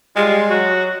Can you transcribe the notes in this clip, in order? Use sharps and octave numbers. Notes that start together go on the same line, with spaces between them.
G3 G#3 F4
F#3 F#4